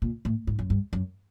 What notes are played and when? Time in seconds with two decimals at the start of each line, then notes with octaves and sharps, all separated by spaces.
0.02 A#2
0.25 A2
0.47 G#2
0.59 F#2
0.70 G2
0.93 F#2